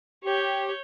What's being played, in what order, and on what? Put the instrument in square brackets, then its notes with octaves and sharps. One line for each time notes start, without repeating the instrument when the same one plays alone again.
[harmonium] G4 [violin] C#5 G6